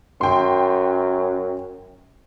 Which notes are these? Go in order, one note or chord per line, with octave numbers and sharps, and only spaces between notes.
F#2 G5 C6